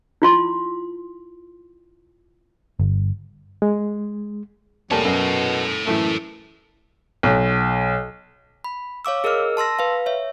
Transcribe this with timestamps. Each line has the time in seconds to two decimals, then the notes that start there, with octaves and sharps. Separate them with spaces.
0.22 E4 F4 C6
2.80 G1
3.62 G#3
4.91 F1 G3 A#3 A4 C#5 A5
5.05 F#2 B2
5.86 F#2 A2 E3 A3
7.23 B1
8.64 B5
9.05 C#5 F5 D6 E6
9.24 G#4 A#4 D#5 E6 F6
9.57 A5 C6 E6 A#6
9.79 B4 F5
10.06 C#5 E5